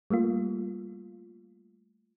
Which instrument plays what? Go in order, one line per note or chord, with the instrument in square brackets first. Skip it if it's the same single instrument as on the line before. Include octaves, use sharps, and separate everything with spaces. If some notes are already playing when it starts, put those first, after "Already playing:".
[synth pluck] G3 A3 A#3 F4